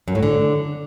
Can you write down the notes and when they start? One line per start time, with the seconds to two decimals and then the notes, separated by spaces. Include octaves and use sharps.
0.08 F#2
0.15 A2
0.23 D3